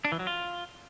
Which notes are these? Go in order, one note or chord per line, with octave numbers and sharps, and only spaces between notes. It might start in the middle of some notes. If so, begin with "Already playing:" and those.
D4
E3
F#3
F4